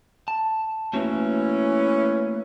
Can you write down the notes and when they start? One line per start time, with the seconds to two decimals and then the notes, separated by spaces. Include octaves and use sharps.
0.28 A5
0.93 E3 A3 A#3 C#4 F#4